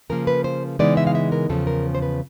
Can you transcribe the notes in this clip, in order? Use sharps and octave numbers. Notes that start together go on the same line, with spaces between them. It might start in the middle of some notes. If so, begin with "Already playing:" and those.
C#3 F3 A#3 A#4
B4
C5
C#3 E3 G#3 B3 D#4 D5
E5
F5
E5
A#4
E2 C#3 F3 A4
A#4
C5
B4